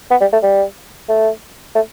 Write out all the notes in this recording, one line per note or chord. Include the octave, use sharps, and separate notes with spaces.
B3
G3
A3
G3
A3
A3